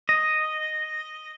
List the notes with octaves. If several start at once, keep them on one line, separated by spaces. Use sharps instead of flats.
D#5